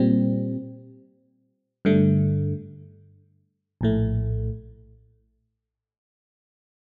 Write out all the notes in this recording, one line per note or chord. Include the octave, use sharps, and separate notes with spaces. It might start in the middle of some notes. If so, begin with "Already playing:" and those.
Already playing: A#2 G3 C4
G2 D3 A3
A#1 A2 A3